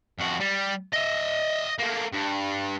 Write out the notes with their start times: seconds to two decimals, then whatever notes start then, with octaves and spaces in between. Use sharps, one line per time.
0.19 F2 F#4
0.40 G3
0.93 D#5 E5
1.79 A3 A#3
2.13 G2